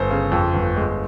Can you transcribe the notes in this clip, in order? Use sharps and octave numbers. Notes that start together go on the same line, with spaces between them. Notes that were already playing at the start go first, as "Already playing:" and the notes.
Already playing: G1 C5
C#3
F2
G1
G#3